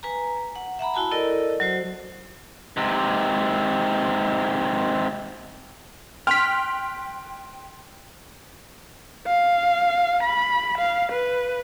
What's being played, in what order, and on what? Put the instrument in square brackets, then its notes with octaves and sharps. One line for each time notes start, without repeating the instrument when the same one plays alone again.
[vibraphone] B4 G#5 A#5
F#5
E5 F#5 A#5 B5
E4 F#4 G#5 A5 B5
E4 A4 A#4 D5 D#5
F#3 F#4 C5
[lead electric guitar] G#2 C3
[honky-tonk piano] G5 C6 F#6 [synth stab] F6 B6
[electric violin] F5
B5
F5
B4